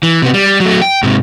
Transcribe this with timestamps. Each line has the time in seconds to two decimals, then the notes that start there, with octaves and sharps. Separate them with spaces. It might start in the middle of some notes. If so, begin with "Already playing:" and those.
0.03 E3
0.22 C3 B3
0.34 G3
0.60 F#3 A3
0.82 G5
1.03 G#2 C3